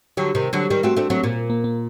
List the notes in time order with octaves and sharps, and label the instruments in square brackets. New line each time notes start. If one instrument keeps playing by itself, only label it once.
[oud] D3 F#3 [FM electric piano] G4
[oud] C3 D#3
D3 F#3
[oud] D#3 G3 [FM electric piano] G4
[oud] A3 C4 [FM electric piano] F#4
[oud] A3 C4 [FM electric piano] D4
[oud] F#3 A3 [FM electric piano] C4
[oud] A#2 [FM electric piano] A#3
[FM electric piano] A#3
A#3